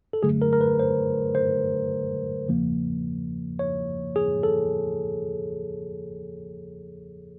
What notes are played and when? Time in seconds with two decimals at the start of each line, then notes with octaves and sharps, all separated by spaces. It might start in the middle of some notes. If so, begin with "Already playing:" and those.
0.13 A4
0.23 F#2 D3 F#3 A3 G#4
0.42 A#4
0.53 A#4
0.61 B4
0.80 C5
1.35 C5
2.48 E2 C#3 F3 A#3
3.59 C#5
4.16 G#4
4.43 A4